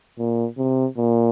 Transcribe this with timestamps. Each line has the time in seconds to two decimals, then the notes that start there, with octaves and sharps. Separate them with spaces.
0.19 A#2
0.58 C3
0.98 A#2